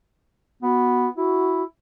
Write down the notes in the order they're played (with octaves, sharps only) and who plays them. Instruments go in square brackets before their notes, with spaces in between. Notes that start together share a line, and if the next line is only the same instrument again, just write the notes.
[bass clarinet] B3 [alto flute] F#4
[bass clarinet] E4 [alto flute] F#4